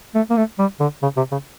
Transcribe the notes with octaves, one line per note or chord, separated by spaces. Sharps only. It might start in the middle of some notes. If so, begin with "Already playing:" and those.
A3
A#3
A3
G3
D3
C#3
C3
C#3